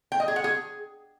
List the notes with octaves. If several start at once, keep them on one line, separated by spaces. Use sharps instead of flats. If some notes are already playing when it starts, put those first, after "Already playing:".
G5
D#5
G#4
F#5
G#4